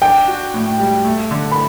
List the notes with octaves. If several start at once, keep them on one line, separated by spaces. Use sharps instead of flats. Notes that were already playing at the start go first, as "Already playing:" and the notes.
D4 G5
F#4
A2
G3
A3
D3
B5